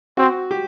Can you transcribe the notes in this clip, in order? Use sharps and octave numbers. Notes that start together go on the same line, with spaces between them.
C4 F#4
G4